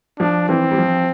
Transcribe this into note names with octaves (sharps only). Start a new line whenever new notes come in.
F3 D4
E3 C4
G3
F3